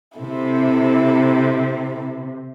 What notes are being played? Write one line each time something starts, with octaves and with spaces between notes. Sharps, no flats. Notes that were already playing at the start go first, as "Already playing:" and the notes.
C3 E4 A4